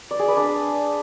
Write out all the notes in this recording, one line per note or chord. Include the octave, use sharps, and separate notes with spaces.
D5
G#4
B4
D4